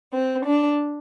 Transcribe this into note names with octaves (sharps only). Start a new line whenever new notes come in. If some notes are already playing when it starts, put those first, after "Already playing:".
C4
D4